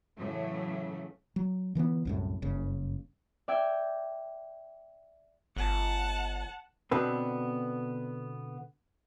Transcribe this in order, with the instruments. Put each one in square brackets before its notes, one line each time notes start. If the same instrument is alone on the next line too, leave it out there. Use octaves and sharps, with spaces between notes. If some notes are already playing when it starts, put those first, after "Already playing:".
[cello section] A2 C#3 E3 F#3 A3
[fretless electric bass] F#3
D3 E3 A#3 B3
C2 F#2 A2
F#1 G2 C#3
[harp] D5 E5 G5 G6 G#6
[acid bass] G1 [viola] F#5 A5
[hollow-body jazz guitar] B2 D3 B3 C4 A4 B4